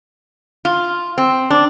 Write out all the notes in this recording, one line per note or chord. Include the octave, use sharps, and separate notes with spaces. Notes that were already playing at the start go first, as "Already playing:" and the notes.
F4
C4
D4